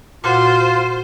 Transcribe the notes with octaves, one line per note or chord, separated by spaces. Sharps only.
A#2 F4 F#4 C5 F#5